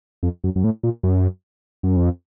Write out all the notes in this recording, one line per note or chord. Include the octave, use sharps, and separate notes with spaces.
F2
F#2
F#2
A2
A#2
F#2
F#2
F2